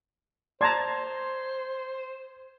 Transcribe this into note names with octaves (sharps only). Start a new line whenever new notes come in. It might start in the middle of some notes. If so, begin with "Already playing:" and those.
C5 D5 A5 A#5 C6 G#6